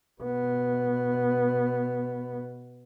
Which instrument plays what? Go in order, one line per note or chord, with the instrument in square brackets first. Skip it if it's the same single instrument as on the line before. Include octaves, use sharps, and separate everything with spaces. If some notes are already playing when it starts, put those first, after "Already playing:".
[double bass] B2 B3